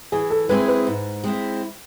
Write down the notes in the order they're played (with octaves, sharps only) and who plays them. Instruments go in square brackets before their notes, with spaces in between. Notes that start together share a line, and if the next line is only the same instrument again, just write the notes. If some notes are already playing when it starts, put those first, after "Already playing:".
[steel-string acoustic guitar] E3 [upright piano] G#4
[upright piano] A4
[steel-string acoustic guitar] G#3 C4 E4 G#4 [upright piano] B4
[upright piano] B4
[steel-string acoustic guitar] G#2
G#3 C4 E4